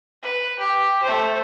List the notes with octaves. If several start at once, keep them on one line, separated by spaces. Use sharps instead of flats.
B4
G4
A3 C5